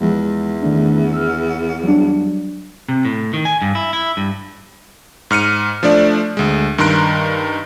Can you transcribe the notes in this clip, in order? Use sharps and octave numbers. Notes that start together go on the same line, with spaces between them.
E2 F3 G#3
D#3 A3 D4
E6 F6
F#3 G3 D4
C3
A2
D#3
G#5
G2
E4
E4
G2
G#2 F6 C#7 D#7
F3 A3 D4 D5
D2 G#3
G2 D#3 A#5 C6 F#6 D7